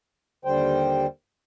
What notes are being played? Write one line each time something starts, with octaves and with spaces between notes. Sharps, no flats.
D#2 D3 G3 C5 G5